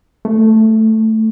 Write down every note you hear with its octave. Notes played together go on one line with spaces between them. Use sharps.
A3